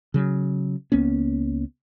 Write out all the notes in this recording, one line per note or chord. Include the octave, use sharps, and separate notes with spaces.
C#3 F#3
C#2 A#3 B3 C#4